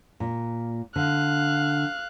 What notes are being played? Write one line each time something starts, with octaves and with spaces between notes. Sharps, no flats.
A#2
D3 F5 F#6